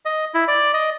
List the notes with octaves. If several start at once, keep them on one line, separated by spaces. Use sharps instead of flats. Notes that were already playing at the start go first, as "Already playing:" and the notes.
D#5
E4
D5
D#5